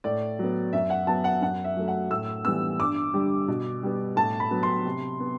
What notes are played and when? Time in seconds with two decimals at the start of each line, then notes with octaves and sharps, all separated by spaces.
0.04 A2 D5
0.39 F#3 B3
0.73 F#2 E5
0.90 F#5
1.07 F#3 B3 A5
1.24 F#5
1.42 F#2 F#5
1.64 E5
1.76 F#3 A3
1.88 F#5
2.11 A2 E6
2.45 E3 G3 B3 E6
2.80 G2 D6
3.14 D3 G3
3.48 B2
3.83 G3 B3
4.16 A2 A5
4.40 B5
4.51 F#3 B3
4.63 C6
4.85 C3
5.20 B3